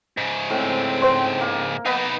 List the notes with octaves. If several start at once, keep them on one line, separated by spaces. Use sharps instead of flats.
G#2 C#3
A2 C4 G5
C5 C6
A#3
B3 D#4 B4 F#5